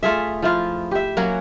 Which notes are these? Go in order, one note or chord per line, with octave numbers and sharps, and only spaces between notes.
A3 F4 G#4 E5
F3 E4 F4
G4 E5
F#3 A#3 C#4 F#4